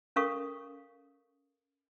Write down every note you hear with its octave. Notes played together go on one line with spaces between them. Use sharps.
C#4 A4 A#4 F5 C#6 D#6